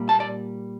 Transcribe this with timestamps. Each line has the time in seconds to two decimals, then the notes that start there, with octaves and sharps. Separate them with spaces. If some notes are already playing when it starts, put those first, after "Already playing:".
Already playing: A#2 G3 A#3
0.09 A5
0.20 D5